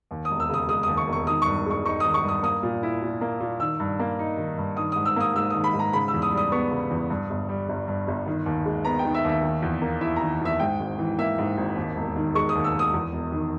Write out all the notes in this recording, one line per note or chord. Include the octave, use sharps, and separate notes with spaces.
D#2
D#6
E1
E6
C#3 D#6
G#3 D#6
D#2 D#6
C#6
E1
C#6
D#3 D#6
G2 C#6
G#3 C#6
D#4 C#6
D#3 D#6
C#6
G2
D#6
A#3 D#6
A#2
E4
A#2
A#3
A#2
D#3 E6
G2
A#3
D#4
D#3
G2
D#3 D#6
G#2 D#6
E6
A#3 D#6
G#2 E6
D#3 D#6
B5
G#2
A#5
C#3 B5
E6
E2
D#6
G3
D#6
B3 C#6
C#3
E2
G2
G1
G3
G1
G2
G1
D#3
D#2
G#3
B3 A#5
G5
D#3
E5
D#2 E5
D#3
E2
A#3
E4 E5
D#3 A#5
E2 E5
G#2 G5
G#1
E3
A#3 E5
G#2
G#1
D#2
E1
D#3
G#3 C#6
D#6
D#2
E6
E1 D#6
E2
E1
D#3